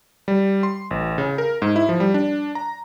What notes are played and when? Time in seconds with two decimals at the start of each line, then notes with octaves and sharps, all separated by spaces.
0.28 G3
0.63 C6
0.91 A1
1.18 C#3
1.38 A#4
1.62 G#2
1.76 E4
1.89 F3
2.00 G3
2.14 D4
2.55 A#5